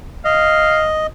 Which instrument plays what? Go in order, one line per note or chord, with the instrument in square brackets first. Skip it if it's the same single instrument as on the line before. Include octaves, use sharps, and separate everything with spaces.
[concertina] D#5 [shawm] F5